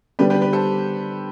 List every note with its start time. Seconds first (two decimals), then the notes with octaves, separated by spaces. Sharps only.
0.19 D3 G3 B3 D4 G4 B4
0.30 G4 B4
0.42 G4 B4
0.53 A4 C5